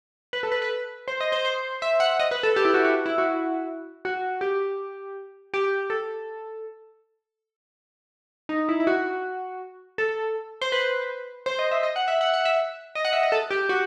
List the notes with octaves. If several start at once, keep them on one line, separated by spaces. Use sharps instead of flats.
B4
A4
B4
B4
C5
D#5
C5
C5
E5
F#5
D#5
B4
A4
G4
E4
F#4
F#4
E4
F#4
F#4
G4
G4
A4
D#4
E4
E4
F#4
A4
C5
B4
C5
D#5
E5
D#5
F#5
E5
F#5
F#5
E5
D#5
F#5
E5
D#5
A4
G4
F#4